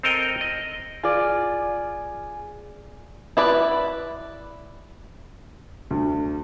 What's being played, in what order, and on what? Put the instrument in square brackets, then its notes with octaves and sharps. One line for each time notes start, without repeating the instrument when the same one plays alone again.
[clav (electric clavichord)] C4 A4 A#4 D#5 G5
D#5
[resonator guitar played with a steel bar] F4 D5 [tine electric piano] G#4 G#5
[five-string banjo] E4 B4 D5
[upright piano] D2